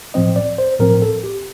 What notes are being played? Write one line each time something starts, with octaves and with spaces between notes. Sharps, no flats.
A2 F3 C4 D#5
D5
C5
A2 F3 C4 A#4
A4
G4